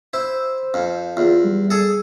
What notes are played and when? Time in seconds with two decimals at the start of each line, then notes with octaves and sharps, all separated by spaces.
0.13 E4 C5
0.74 F2
1.17 E2 F4
1.44 G3
1.70 G#4 A4